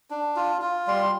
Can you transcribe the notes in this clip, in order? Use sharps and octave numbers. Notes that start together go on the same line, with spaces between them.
D4
F4
F4
G3 C6